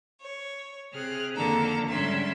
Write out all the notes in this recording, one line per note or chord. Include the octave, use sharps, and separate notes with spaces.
C#5
C3 G#4 F6 F#6
F2 D3 D#3 A#3 A4 A#5
G#2 D3 G3 C#4 E5 C6